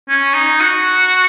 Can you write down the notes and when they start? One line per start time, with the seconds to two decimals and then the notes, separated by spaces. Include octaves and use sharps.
0.09 C#4
0.34 D#4
0.61 F#4